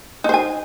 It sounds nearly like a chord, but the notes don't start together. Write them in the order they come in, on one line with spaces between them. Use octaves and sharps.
D#4 C5 G#5